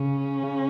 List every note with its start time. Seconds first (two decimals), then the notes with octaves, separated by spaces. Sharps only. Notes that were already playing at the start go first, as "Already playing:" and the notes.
Already playing: C#3 C#4
0.43 C#3